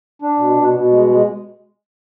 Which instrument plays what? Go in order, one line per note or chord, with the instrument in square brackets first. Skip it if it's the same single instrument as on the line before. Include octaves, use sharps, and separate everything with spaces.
[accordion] D4
B2
B2
B2
G#3
G#3